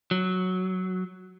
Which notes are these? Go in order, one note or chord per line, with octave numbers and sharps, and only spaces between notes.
F#3